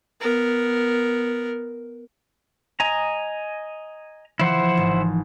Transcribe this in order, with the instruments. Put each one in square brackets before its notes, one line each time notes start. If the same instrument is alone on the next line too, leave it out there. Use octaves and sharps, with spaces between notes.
[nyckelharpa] B3 A#4
[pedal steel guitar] D#5 G#5 A#5
[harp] E3 F3 [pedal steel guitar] E4 C5 F#5
[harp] G#1